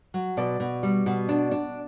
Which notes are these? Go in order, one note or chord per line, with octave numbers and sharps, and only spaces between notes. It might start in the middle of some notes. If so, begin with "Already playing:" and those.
F#3
B2 D5
B2
G3
B2
D4
D4